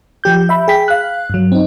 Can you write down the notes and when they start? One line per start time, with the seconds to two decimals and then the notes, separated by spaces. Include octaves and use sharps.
0.24 F3 G4 G6
0.49 E5 B5
0.68 G#4 G5 B6
0.88 F5 F#6
1.30 G2 F#3
1.52 C4 D#4